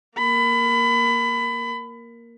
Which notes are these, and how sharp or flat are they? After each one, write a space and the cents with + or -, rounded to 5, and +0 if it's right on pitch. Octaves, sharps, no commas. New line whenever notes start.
A#3 +0 B5 +25